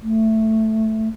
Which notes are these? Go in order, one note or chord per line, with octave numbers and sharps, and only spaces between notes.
A3